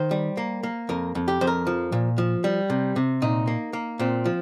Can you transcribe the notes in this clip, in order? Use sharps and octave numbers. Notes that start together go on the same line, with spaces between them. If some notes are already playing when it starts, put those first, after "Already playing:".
Already playing: D#3 C5
G3
A#3
A#3
F2 A#4
F2
G4
F2 C5
A#4
F3
A#2
F3
G3
C3
C3
A#2 D#4
A#3
A#3
A#2 C4
F3